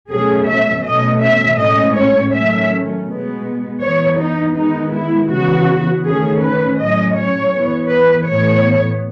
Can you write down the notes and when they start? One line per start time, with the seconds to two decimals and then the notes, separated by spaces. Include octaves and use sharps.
0.11 B2 F#3 A3 C#4 G#4
0.47 E5
0.85 B2 A3 C#4 D#5
1.22 E5
1.59 A2 G#3 C#4 D#5
1.96 C#5
2.33 D#3 F#3 A3 C#4 E5
3.07 B2 G#3 B3
3.82 E3 B3 C#5
4.19 D#4
4.56 D#3 G#3 B3 D#4
4.93 E4
5.30 C#3 E3 B3 F#4
6.04 D#3 A3 C#4 G#4
6.41 B4
6.78 A2 F#3 C#4 D#5
7.16 C#5
7.53 E3 B3
7.89 B4
8.26 A2 E3 B3 C#5